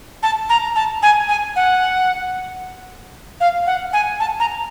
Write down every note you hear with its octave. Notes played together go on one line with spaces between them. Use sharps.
A5
A#5
A5
G#5
G#5
F#5
F5
F#5
G#5
A5
A#5